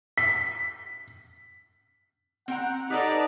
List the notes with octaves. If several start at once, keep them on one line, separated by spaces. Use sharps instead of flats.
B6
C4 F#5 G5 A#5
D#4 G4 A4 B4 D5 A5